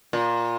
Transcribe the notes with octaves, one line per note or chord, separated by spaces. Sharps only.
A#2